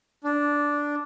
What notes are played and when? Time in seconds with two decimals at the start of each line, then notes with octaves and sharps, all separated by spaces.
0.24 D4